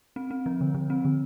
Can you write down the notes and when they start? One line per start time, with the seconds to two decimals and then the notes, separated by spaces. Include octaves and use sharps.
0.16 C4
0.31 C4
0.46 F3
0.61 D3
0.74 D3
0.90 C4
1.05 D3